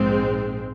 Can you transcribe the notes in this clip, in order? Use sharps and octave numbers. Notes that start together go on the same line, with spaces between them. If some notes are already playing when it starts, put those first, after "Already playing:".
Already playing: A#1 G#2 G#3 C4